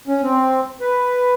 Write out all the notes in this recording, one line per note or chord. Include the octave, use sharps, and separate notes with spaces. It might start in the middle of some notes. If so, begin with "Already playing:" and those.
C#4
C4
B4